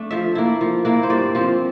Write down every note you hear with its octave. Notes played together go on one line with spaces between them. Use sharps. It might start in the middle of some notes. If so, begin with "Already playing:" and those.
Already playing: A3 D4
F3 E5
A#3 E4
F3
A#3 E4
C5
G2 D5
F3 C4